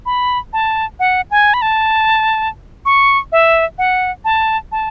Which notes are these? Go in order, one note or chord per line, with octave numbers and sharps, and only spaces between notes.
B5
A5
F#5
G#5
B5
A5
C#6
E5
F#5
A5
A5